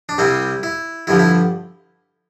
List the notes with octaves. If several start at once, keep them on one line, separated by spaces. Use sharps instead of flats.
D4
C2 C3 G3 C4 E4
E4
G2 D3 F3 E4
E4